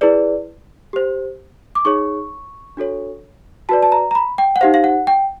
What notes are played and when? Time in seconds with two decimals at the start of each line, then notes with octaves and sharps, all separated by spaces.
0.01 E4 G#4 B4 D5
0.93 G4 C5
1.75 D6
1.85 D#4 G#4 C#5 C#6
2.77 D4 F#4 A4 C#5
3.69 F#4 B4 D5 A5
3.83 A5
3.92 A#5
4.11 A#5
4.15 B5
4.38 G5
4.56 F#5
4.61 D#4 G4 C5 F5
4.74 F5
4.84 F#5
5.07 G5